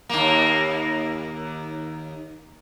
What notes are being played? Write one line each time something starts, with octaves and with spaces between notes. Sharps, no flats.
D#2 A#3